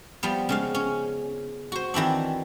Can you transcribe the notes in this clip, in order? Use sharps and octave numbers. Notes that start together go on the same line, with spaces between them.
F3 G3 B3
C#3 G#3 F5
C#4
F#4 C5
D#3 E3 C4 D4